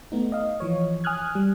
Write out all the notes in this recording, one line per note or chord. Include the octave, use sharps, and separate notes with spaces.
A3 B3 D#4
D#5 F5
E3 F3 C#5
G#5 D#6 F6 F#6 G#6
G3